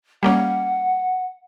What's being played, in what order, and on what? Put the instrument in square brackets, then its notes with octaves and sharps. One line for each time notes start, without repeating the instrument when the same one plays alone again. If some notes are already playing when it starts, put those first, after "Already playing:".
[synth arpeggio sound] G3 A#3 C#4 [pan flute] F#5